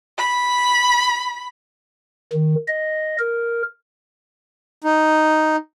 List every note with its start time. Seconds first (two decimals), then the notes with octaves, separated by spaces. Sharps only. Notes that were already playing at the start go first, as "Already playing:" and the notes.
0.19 B5
2.33 D#3
2.68 D#5
3.19 A#4
4.84 D#4